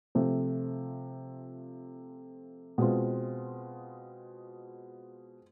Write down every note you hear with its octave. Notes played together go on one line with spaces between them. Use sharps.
C3 F3 A3
B2 G#3 C4 F4